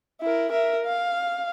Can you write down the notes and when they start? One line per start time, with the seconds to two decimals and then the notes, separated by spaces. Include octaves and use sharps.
0.21 E4 A#4
0.51 A#4 E5
0.85 F5